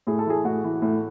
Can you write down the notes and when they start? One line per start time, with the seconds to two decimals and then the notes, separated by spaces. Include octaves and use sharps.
0.07 A2 G#4
0.19 A4
0.26 E3 G#4
0.44 A2 F#4
0.64 E3
0.82 A2